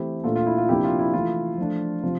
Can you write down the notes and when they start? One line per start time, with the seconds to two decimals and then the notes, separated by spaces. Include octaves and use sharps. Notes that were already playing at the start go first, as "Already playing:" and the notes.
Already playing: E3 A3 C4 E4 G4
0.24 A#2 A3 D4 F4 A4
0.36 F4
0.46 E4
0.58 F4
0.69 C3 F3 A#3 D4 E4 G4
0.84 F4
0.99 E4
1.13 E3 A3 E4 F4
1.58 F3 A3 D4
2.03 C3 F3